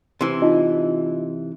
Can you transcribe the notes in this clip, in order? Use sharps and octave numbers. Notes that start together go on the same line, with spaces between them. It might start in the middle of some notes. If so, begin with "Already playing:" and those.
C3 E3 C6
D#4 F4 D#5